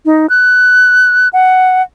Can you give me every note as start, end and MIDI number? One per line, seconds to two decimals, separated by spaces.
0.05 0.26 63
0.29 1.28 90
1.33 1.82 78